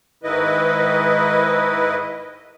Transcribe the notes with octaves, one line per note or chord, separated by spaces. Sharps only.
G#2 D#3 E4 B4 D#5